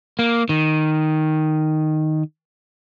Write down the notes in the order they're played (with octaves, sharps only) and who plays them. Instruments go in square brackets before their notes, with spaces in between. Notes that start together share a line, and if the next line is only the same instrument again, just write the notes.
[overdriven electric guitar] A#3
D#3